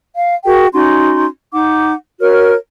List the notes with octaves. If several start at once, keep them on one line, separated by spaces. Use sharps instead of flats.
F5
F#4 G#4 A#4 G5
C#4 D#4 F#4 C6
D#4 F#5 D6
F#4 A#4 C#5 F6